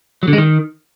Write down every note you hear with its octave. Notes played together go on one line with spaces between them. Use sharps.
F#3
D3
G#3
D#3